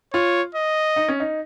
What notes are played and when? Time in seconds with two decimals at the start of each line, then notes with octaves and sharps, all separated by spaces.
0.13 F4 C#5
0.55 D#5
0.96 D#4
1.08 C#4
1.20 D#4